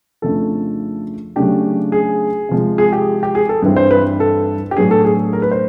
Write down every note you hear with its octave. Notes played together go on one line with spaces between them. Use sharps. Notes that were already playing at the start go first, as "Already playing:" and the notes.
F2 C#3 F3 A3 D4 A4
C#3 F#3 A3 D4 G4
G#4
C3 F3 G#3
G#4
G4
G4
G#4
A4
G2 E3 G3 C4
C5
B4
A4
G4
A2 F#3 B3 D4 G#4
A4
G#4
A#4
B4
C5